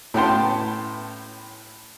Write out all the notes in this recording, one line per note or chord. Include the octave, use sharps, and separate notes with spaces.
A2 B3 C#4 G5 A5 C6